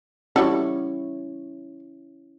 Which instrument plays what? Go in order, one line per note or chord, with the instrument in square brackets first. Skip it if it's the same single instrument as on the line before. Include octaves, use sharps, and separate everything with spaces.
[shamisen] G3 F#4 A4 [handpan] C#4 E4 C#5